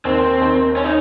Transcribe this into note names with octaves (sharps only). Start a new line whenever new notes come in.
D#2 C4
D#2
C#4
D#4